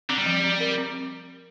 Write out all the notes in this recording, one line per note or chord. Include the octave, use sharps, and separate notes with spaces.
D3 C4
G3
F3
C4
A#4
C4